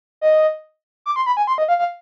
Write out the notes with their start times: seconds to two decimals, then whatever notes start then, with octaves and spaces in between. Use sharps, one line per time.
0.21 D#5
1.06 D6
1.16 C6
1.26 B5
1.37 G#5
1.47 C6
1.58 D#5
1.68 F5
1.79 F5